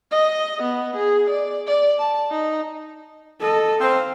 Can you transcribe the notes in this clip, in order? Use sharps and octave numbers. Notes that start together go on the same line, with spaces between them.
D#5
B3
G#4
D5
D5
A5
D#4
A4 D#5
C4 F5